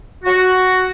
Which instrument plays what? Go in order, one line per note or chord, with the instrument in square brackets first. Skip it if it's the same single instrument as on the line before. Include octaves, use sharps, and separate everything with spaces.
[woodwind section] F#4